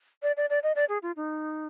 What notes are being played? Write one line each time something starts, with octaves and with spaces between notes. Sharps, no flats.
D5
D5
D5
D#5
D5
G#4
F4
D#4